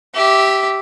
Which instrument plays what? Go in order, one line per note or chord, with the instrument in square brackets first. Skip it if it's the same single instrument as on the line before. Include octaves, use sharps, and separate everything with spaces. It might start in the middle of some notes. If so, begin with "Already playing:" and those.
[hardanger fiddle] G4 E5